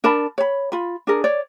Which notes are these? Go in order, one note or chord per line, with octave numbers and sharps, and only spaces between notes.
D4 A#4 A5 B5
C#5 B5
F4 B5
D4 G#4 A#4
C#5 D5